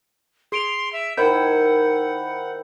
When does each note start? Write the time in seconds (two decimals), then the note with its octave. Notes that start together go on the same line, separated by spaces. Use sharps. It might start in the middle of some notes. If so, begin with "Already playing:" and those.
0.52 G#4 C6 D7 F7
0.93 E5
1.17 D#3 E4 C5 F#5 G5 G6